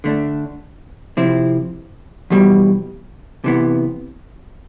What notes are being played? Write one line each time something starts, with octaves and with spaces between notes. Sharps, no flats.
D3 A3 D4
C3 F3 C4 E4
E2 B2 G3
C3 E3 B3